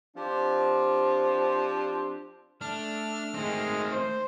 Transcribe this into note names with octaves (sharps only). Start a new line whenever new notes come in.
F3 C4 D4 G4
A3 D4 F6
D#3 G#3 C4
C5